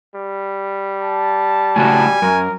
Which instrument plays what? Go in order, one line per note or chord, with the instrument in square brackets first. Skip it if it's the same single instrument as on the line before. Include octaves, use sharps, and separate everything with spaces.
[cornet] G3
[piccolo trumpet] A5
[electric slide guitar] A2 C#3 F#4 [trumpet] G#5
[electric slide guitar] F#2 [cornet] A#4